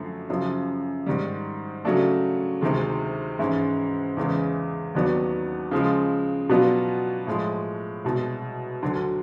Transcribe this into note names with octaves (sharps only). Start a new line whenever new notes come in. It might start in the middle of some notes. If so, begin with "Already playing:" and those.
Already playing: F#2 D3 F3 A3
F#2 C#3 F3
G#2 D#3 G3
C#3 F#3 A3 D4
D2 C3 D#3 G#3
G#2 E3 G#3 C#4 E4
E2 C#3 E3 G#3 C#4
D#2 D#3 F#3 B3 D4
C#3 F3 G#3
B2 F#3 B3 D4 F4
A2 F3 G#3
C2 B2 G#3
D2 D3 F#3